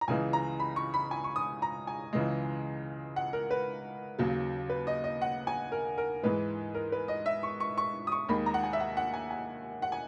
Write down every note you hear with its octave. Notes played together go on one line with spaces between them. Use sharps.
A#5
C#2 C#3 E3 G#3 G#5
A#5
B5
C#6
B5
G#5
C#6
D#6
A#5
G#5
C#2 C#3 E3 G#3
F#5
A#4
B4
D#2 C#3 F#3
B4
D#5
D#5
F#5
G#5
A#4
A#4
G#2 E3 G#3 B4
A#4
B4
D#5
E5
C#6
C#6
C#6
D#6
C#6
D#2 D#3 G#3 B5
A#5
F#5
G#5
E5
F#5
F#5
G#5
G#5
F#5
G#5